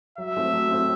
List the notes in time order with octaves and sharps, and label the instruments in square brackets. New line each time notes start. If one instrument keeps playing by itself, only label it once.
[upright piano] F#3 [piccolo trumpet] E5
[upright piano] A3 C4
F#3
A3 C4